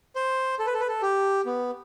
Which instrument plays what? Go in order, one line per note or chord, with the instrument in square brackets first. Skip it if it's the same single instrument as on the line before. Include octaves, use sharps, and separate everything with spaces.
[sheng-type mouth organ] C5
A4
B4
A4
B4
A4
G4
B3